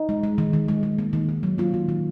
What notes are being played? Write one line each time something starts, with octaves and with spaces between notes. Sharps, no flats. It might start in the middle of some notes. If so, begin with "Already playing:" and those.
Already playing: D#4
G#3
G#3
D#3
D#3
G#3
G#3
A#3
D#3
D#3
F#3
A#3 F4
D#3
D#3